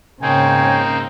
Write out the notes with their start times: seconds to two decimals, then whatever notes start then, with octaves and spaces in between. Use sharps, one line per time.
0.22 G#2 C#3 A#3 C4 D#4 C#5 G5 G#5